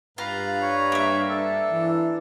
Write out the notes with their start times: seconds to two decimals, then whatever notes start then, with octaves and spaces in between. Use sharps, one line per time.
0.18 G2 F4 B4 F5 A#5
0.62 C#5
0.92 A#3 E5
1.29 D4 A4
1.71 E3